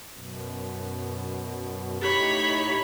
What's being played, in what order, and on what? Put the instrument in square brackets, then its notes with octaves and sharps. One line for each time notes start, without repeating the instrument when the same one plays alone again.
[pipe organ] F#2 B2
[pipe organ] A2 D#4 [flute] G4 [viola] C#5 B5